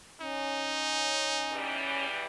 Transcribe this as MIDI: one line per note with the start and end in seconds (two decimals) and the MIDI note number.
0.21 2.06 61
0.21 1.82 63
1.52 2.27 40
1.52 2.27 52
1.52 2.27 55